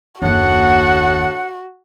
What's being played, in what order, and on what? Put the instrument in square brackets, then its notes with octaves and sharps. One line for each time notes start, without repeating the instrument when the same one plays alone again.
[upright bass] F#1 D#2 [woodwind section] A2 D4 F#5 [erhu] F#4